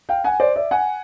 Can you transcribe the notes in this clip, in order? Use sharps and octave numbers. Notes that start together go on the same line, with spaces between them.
F5 G5
F#5 G#5
C5 D5
D5 E5
F#5 G#5